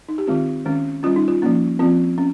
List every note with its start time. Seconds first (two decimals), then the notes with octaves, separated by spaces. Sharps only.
0.09 D#4
0.18 G4
0.27 D#3 G#3 C4 F4
0.66 D#3 G#3 C#4
1.03 G3 C#4 F4
1.16 D#4
1.28 F4
1.42 F3 A#3 C#4
1.79 F3 C4 F4
2.18 C#4